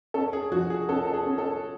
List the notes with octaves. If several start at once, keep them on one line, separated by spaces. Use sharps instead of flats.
C#4 A4
G#4
F3 F#4
G#4
C#4 A4
A4
G#4
C#4
A4